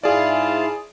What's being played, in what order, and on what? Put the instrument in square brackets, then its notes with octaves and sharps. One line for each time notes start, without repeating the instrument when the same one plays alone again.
[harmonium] G#2 E4 [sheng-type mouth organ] F4 F5 A5 [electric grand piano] G#4 D5